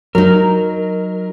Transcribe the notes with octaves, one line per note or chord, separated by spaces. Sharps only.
F#3 D#4 A#4